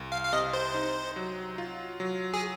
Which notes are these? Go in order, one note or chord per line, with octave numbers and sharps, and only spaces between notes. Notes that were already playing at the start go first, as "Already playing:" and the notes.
Already playing: C2
F5
F5
C3 D#5
C5
D#4
F#3
F4
F#3
G#4